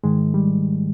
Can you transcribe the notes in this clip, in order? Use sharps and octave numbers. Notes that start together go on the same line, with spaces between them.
G#2 D#3 G#3
G3